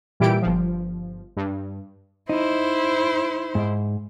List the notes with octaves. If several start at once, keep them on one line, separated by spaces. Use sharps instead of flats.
A#2 E3 G3 E4 G4 D7
G1 F3
G2
D#4 E4 C5
G#2